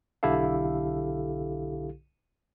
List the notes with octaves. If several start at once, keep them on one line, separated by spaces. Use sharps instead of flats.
B1 D3 E4 G4 A4 F5